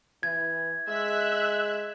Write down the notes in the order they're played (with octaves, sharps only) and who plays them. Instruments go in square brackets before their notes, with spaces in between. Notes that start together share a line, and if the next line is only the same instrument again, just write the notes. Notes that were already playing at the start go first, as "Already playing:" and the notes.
[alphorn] E3 [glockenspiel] G#6
[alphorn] G#3 [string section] E5 F#6